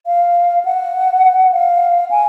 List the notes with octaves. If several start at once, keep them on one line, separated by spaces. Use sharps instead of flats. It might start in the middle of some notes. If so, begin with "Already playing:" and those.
F5
F#5
F5
G#5